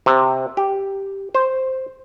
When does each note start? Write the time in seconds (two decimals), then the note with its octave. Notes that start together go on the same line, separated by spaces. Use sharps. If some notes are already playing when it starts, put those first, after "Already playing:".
0.06 C3
0.57 G4
1.35 C5